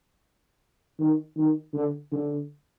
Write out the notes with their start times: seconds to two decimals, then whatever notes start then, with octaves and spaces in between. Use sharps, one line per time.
0.99 D#3
1.37 D#3
1.74 D3
2.12 D3